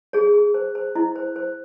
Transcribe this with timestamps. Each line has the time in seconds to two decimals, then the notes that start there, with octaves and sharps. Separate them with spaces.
0.13 G#4 C#5
0.34 G#4
0.54 C5
0.75 C5
0.95 E4 D#5
1.16 C5
1.36 C5